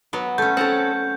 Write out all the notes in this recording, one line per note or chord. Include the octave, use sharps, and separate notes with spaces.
F#3 B3
A3 C#4 G6
C4 C#4 A4 F#5